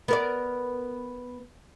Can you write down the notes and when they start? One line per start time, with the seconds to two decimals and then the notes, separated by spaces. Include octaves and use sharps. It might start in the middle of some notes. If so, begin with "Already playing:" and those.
0.08 B3 A#4 D5